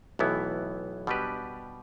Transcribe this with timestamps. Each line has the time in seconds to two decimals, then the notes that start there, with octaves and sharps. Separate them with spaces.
0.19 B1 A2 E3 B3 E4
1.07 B2 G3 D4 G4 B4